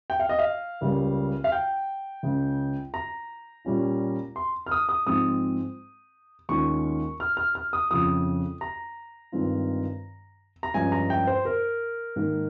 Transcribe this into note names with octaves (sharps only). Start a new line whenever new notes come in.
G5
F5
D#5
F5
C#2 C#3 G3 A#3
F5
G5
C#2 C#3 G#3
A#5
A#2 G3 C#4 F4
C6
F6
D#6
D#6
G#2 F3 G#3 C4 D#6
D#2 D#3 G#3 C#4 F4 C#6
F6
F6
F6
D#6
F2 C#3 F3 D#6
A#5
G2 D#3 G#3 C4 F4
A#5
G2 F3 G#3 C#4 G#5
A#5
G5
C5
A#4
G#2 D#3 A#3